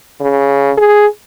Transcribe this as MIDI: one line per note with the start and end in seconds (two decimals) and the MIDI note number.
0.21 0.72 49
0.78 1.07 68